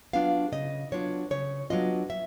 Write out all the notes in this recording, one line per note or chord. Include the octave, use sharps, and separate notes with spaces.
F#3 B3 D4 F4 F5
C#3 D#5
F#3 B3 D4 F4 C#5
C#3 C#5
F#3 B3 D4 F4 D#5
E5